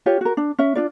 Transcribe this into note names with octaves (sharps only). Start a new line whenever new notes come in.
F4 G4 C#5
F#4 A#4
D4
C#4 E5
D4 F4 D5